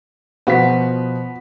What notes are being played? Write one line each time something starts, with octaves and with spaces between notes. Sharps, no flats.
B2 F3 B3 F#4 B6